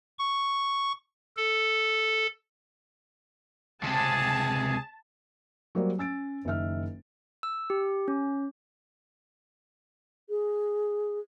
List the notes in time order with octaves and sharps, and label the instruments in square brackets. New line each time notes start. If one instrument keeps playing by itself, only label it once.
[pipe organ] C#6
A4
[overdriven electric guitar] C#2 C3 [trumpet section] G#4 [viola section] A5
[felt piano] F#3 G3 A#3 C5 D5
C#4 E6 A6 D7
F#1 D#3 E5 F6
[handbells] E6
G4
C#4
[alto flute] G#4